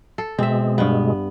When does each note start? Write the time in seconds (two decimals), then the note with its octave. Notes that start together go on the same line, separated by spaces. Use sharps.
0.18 A4
0.39 B2 G#3 C4 E5
0.78 G2 B3